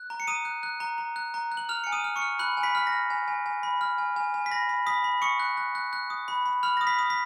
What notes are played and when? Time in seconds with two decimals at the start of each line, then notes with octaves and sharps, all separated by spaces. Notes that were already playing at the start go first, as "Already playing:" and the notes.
Already playing: F#6
0.10 A#5
0.20 C#7
0.27 A#5 D#6 D#7
0.45 F#6
0.63 F#6
0.80 A#5
0.98 A#5
1.16 F#6
1.34 A#5
1.52 F#6
1.57 F#7
1.69 F6 F7
1.84 G#5 C#7
1.92 D#6 D#7
2.04 F6
2.16 C#6 C#7
2.22 F6
2.39 B5 F#6 F#7
2.57 G#5
2.63 B5 B6
2.75 F6 B6
2.87 A#6
2.92 F6
3.10 G#5
3.28 G#5
3.46 G#5
3.63 B5
3.81 F6
3.98 G#5
4.16 G#5
4.34 G#5
4.46 B6
4.51 B5 A#6
4.69 B5
4.87 B5 D#6 B6
5.04 B5
5.22 C#6 D#6 C#7
5.40 F#6
5.57 F#6
5.75 F#6
5.93 F#6
6.10 D#6
6.28 B5
6.46 B5
6.63 B5 F6 F7
6.77 D#6 A#6
6.87 B5 B6
6.99 D#6
7.10 B6